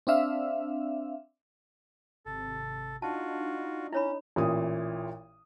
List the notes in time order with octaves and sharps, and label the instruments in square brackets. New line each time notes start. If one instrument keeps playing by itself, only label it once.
[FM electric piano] C4 D4 E5 F5
[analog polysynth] G#1 C3 [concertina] A4
[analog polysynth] D4 D#4 [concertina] F4 F#4 [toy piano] A5
[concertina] C#4 [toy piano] E4 C#5 B5
[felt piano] A1 A#2 E3 D#6